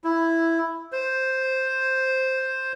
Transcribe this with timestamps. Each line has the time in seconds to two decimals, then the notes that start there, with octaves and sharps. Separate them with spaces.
0.04 E4
0.92 C5